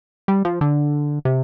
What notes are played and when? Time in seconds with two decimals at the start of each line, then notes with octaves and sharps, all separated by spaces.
0.28 G3
0.45 F3
0.61 D3
1.25 C3